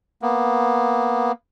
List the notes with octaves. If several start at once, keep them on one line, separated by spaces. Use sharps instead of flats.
A#3 B3